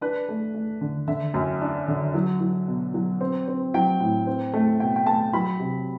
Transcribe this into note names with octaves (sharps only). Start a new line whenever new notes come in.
D4 B4
A3
A3
D3
D3 E5
F#2
D4
D3
F#3
F#3
B2
F#3
C4
C4
F#3 G5
A2
C4
A3
B2 G5
G5
A3 A5
F#3 B5
C3